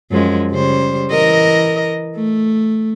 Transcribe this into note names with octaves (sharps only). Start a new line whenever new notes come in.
F#2 F3 G#3
C#3 G3 C5
E3 A#4 D#5
A3